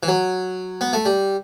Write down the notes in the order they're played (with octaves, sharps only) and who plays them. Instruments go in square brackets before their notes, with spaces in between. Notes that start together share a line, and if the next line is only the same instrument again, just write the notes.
[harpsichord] E3
F#3
B3
A3
G3